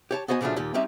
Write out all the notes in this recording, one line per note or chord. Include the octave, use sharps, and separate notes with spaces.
G4 C#5 A5
B3 F#4 C5 D#5 G#5
A#2 C#3 F3 F#3 A3 D4
D#2 A#2 G4
G3 C4 C#4 D#4 G4 E5